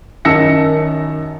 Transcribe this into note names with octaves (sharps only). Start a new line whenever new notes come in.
F#2 D#3 A5 E6 A#6 C#7